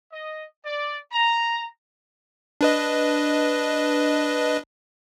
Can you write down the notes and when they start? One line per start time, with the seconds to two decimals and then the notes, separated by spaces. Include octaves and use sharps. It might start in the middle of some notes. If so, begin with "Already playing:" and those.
0.13 D#5
0.64 D5
1.12 A#5
2.61 D4 B4 D#5